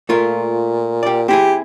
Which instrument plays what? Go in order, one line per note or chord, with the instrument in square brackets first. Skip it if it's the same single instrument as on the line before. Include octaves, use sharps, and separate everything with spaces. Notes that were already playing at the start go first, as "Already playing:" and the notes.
[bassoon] A#2 [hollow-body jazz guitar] A3 F4 A#4
[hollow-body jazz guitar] G4 D5
[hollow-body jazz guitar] C4 E4 G#4 [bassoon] G4